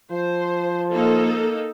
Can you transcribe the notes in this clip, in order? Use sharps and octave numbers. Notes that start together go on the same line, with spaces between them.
F3 C5
A#3 D#4 A4